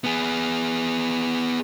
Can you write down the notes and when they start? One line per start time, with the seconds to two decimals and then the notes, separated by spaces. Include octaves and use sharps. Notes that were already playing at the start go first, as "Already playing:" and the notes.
0.04 B3 G#4